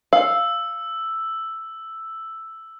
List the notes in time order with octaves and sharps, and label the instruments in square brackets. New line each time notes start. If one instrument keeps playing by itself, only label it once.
[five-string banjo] F5 [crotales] E6